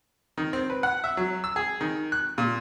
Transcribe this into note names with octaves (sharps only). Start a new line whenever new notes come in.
D#3
C4
B4
F#5
E5
F#3
E6
G#4
D#3
F#6
A#2